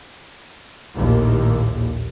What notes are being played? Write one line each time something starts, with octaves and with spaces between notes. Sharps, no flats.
A#1 D#2 A2